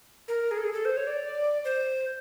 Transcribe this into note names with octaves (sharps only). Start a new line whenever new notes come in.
A#4
G#4
A4
G#4
A4
C5
C#5
D5
C5